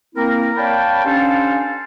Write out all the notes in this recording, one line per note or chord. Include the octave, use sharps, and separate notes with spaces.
A#3 C4 E4 A#4
C#5 D5 F5 G5 A5 B5
C#4 D4 G4 A4 C5 F5